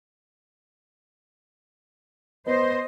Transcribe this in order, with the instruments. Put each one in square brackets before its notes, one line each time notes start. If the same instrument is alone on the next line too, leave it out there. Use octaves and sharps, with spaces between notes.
[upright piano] B3 [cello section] C5 [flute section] D#5